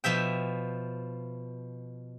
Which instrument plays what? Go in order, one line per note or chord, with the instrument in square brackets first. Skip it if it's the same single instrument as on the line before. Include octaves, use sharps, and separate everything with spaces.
[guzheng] B2 F3 E5 G5